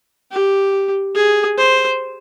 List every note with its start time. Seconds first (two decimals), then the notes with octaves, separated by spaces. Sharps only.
0.32 G4
1.15 G#4
1.58 C5